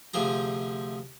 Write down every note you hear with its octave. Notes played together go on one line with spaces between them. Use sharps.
D2 C3 F3 G#4 A#5